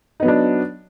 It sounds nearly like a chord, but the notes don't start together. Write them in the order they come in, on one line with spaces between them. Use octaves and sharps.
D#4 B3 F#3 D4